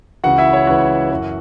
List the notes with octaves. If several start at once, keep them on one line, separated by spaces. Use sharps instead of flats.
C#2 C#3 E3 F#4 F#5
E4 E5
C#5
C#2 C#3 E3 F#4 F#5
F#2 E3